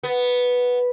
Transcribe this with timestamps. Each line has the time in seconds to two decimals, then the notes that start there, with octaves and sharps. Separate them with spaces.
0.03 B3